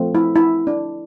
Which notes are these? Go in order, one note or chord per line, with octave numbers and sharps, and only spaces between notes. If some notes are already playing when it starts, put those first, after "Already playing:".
Already playing: F3 A3 C4
E4
E4
D4